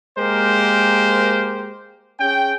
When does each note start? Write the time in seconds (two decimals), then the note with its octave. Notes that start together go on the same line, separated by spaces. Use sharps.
0.18 G#3 A#3 G4 A#4 C5
2.20 C#4 G#4 G5